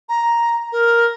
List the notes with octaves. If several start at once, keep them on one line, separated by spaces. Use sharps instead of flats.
A#5
A#4